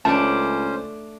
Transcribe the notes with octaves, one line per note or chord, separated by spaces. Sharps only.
C#2 A3 C#4 D4 C5 A5